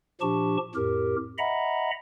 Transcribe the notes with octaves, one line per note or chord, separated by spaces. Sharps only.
A#2 F3 D4 G4 A5 C#6
F2 A2 G4 A#4
D#5 E5 F#5 A#5 B5